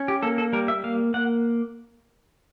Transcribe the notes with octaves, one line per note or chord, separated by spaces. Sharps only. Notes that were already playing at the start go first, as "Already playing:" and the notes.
Already playing: C#4
G4
A#3 A4
A4
G3 A#4
E5
A#3 F5
A#3 F#5